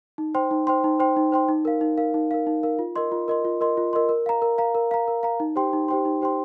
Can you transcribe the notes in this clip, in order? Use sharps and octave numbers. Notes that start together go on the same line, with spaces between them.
D#4
C5 G5 C6
D#4
C5 G5 C6
D#4
C5 G5 C6
D#4
C5 G5 C6
D#4
A#4 F5
D#4
A#4 F5
D#4
A#4 F5
D#4
A#4 F5
F4
A#4 D#5 C6
F4
A#4 D#5 C6
F4
A#4 D#5 C6
F4
A#4 D#5 C6
A#4
F5 A#5
A#4
F5 A#5
A#4
F5 A#5
A#4
F5 A#5
D#4
G4 C5 G5 C6
D#4
G4 C5 G5 C6
D#4
G4 C5 G5 C6